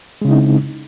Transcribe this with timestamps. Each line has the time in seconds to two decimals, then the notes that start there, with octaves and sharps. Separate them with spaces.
0.22 G#3
0.25 C#3
0.28 E4
0.31 D#4
0.34 C4